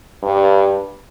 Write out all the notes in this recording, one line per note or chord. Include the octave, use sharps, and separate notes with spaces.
G2